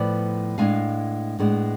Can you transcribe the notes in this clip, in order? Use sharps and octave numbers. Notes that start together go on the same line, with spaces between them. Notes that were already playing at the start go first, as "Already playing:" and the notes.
Already playing: A2 F3 B3 B4 D5
A2 G#3 B3 D4 F5 G#5
A2 G#3 B3 D4